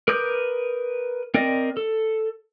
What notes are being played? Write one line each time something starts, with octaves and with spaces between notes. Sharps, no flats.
A#4 B4 D6 D#6 G6
C4 A#4 D5 D#5
A4